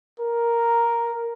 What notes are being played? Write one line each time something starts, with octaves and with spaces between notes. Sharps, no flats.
A#4